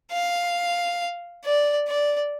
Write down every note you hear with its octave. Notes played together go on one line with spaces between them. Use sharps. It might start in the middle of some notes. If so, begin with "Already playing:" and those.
F5
D5
D5